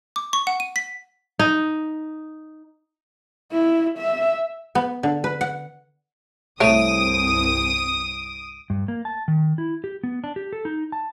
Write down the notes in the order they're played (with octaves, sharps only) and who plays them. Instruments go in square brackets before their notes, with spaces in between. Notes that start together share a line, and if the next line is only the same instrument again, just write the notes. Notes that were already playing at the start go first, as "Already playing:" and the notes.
[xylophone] D6
C#6
F#5
D#7
B6
[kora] D#4
[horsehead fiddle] E4
E5
[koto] B3
D3
B4
F#5
[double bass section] C2 G2 C4 [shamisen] A3 C#5 [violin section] D#6 [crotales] D7 D#7
[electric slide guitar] G2
A#3
A5
D#3
E4
G4
B3
D4
G4
A4
D#4
A5